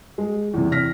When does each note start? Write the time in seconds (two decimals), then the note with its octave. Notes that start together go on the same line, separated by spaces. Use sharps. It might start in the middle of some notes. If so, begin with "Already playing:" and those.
0.18 G#3
0.54 E2 C3
0.72 F6 A#6 B6